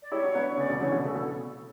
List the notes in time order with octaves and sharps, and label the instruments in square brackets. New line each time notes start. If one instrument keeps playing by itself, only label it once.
[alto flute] D5
[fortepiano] E4 G4 [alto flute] C#5
[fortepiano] D4 F#4
B3 D4
[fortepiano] C#3 [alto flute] D5
[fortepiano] B2 D3
[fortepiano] C#3 E3 [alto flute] C#5
[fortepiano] B2 D3
[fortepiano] C#3 [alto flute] A4
[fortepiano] B2 [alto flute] A4